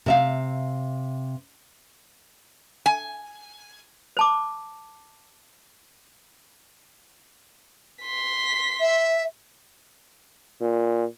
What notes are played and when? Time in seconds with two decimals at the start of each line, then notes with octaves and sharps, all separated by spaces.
0.06 C3 E5 F5
2.86 G#5
4.17 C5 A5 D6
8.02 C6 B6
8.81 E5
10.61 A#2